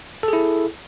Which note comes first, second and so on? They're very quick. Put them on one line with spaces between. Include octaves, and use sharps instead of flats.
A4 G#4 E4